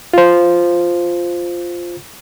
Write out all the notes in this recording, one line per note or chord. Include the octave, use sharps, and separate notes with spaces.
F4 C5